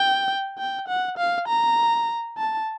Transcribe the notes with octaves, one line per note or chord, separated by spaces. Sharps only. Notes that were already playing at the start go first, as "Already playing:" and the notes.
Already playing: G5
G5
F#5
F5
A#5
A5